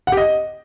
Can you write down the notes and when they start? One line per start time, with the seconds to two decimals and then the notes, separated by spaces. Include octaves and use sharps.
0.07 F#5
0.12 G4
0.17 D#5